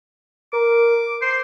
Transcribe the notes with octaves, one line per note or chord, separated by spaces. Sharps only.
A#4 D6
C5 C7